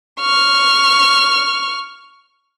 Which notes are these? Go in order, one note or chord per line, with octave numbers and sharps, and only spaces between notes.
C#6 F6